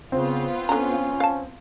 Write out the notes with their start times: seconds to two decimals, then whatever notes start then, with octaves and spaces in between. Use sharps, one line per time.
0.12 C#3 B3 C4 F4
0.69 D3 C#4 A#5
1.20 F5 A5